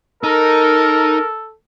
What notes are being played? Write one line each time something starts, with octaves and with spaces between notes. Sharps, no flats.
D#4 A4 A#4